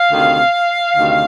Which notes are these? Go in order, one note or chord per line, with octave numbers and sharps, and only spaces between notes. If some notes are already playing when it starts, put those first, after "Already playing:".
Already playing: F5
D2 C3 D#3
D2 C3 D#3